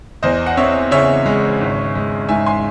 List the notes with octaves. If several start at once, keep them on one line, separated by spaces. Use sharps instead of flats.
E2 C5 D#5
F#5
C4 C#5 E5
C#3 C#5 E5
G#3
G#1
G#3
G#2 E5 G#5
G#5 C6